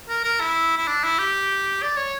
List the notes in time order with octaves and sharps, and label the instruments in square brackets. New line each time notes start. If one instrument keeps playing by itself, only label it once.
[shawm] A#4
A#4
E4
E4
D4
E4
G4
D5
C#5